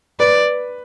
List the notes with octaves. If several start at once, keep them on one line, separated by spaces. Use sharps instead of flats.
B4 D5